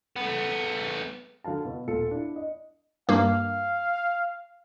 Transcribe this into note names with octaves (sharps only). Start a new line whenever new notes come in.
A3 B3
D3 F#3 F5 A5
B2 B3
D#1 F4 A4 C#7
D4 E4
D#5
G2 A#3 F5